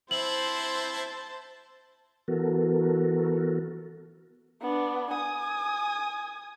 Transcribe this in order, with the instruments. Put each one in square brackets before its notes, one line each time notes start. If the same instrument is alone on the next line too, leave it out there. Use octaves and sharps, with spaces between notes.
[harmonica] C4 E4 [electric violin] C5 A5 [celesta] F#7
[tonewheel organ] E3 B3 F#4 A4 A#4
[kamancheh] B3 D4
G#5 D#6